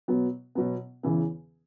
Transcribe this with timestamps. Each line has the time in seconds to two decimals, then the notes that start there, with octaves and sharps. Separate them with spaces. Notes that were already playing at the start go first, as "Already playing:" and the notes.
0.08 B2 F#3 B3
0.55 B2 F#3 B3
1.03 E2 C#3 E3 B3